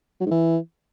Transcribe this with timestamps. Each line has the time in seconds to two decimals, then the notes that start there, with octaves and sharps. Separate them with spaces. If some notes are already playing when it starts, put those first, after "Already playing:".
0.20 F#3
0.26 G#2
0.31 E3